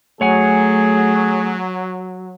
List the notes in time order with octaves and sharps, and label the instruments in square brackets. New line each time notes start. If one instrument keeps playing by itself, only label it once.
[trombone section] F#3 [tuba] A3 [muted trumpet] G#4 [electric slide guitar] C#5 F#5 G#5